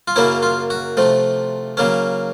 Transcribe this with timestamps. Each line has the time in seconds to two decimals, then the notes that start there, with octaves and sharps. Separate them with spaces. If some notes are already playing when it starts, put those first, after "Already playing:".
0.08 F4
0.16 F#2 C#3 F#3 A#3 C#4 E4
0.43 F4
0.70 F#4
0.97 C3 F3 A3
1.77 C#3 F#3 A#3 C#4